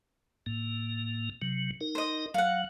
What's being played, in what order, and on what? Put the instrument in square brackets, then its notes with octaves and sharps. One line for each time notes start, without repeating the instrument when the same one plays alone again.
[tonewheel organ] A2 A#3
C3 F#3
D#4 A#4
[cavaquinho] C5 D#5
[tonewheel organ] F#3 [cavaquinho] F5 F#5